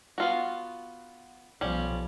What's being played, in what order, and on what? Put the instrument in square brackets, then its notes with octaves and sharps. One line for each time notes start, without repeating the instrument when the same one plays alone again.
[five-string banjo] B3 F4 F#4
[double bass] B1 F3 [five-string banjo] G3 C#4